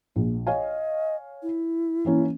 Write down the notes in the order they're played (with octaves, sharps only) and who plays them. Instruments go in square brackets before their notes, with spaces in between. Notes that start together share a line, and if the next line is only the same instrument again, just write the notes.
[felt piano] A#1 [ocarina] A#3
[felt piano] C#5 F5 G#5 [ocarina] D#5
[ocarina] E4
[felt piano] E3 A#3 C#4